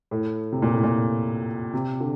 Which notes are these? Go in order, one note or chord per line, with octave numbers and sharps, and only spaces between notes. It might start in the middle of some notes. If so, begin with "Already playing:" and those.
A2
C3
A#2
A2
A#2
C3
D3